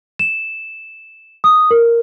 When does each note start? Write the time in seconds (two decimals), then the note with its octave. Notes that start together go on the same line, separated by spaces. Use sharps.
0.19 E7
1.44 D#6
1.71 A#4